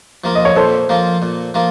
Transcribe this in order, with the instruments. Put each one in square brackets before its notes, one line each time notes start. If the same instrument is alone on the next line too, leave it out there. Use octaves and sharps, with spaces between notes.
[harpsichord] F3 A#3 F4
[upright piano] D#5
C#5
[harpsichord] A#2 [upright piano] A4 C5
[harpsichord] F3 A#3 F4
A#2
F3 A#3 F4